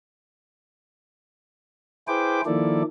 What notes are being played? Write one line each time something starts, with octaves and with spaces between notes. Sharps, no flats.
E4 G#4 B4 C5 G5 D6
D#3 F3 A#3 E4 A4 D5